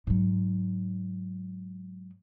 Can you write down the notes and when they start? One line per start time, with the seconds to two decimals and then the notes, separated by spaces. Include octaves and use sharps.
0.07 G#2 F#3